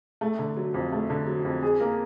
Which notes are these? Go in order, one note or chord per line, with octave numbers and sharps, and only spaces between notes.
A3
D3
F#3
F2
A3
D3
F#3
F2
G#4
A#3